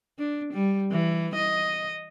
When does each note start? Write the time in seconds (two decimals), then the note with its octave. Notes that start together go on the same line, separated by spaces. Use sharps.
0.19 D4
0.53 G3
0.92 E3
1.35 D#5